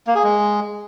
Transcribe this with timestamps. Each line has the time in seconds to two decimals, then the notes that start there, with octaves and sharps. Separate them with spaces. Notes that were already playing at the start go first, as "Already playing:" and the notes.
0.07 A#3
0.15 G#4
0.23 G#3